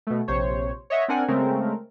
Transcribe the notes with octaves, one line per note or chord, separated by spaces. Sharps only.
B2 A3
A#1 C3 C5 C#5
C#5 D#5 E5 F#5
C4 D4 A#4 F#5 G#5
C#3 G#3 A3 C4 A#4